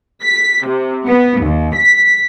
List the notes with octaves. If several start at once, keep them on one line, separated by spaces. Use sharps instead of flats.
B6
C3
B3
D#2
B6